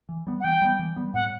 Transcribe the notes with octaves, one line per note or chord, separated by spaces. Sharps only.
E3
G3 B3
F#5
E3 G5
G3 B3
E3
G3 B3
A2 F#5